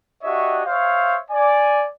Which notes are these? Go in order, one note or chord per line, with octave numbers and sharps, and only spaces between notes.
D4 F#4 G4 C#5 D#5 E5
C5 C#5 E5 F5
D5 G#5